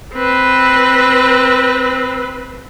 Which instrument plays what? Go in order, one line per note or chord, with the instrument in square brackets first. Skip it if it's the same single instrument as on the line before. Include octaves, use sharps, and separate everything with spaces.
[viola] C4 B4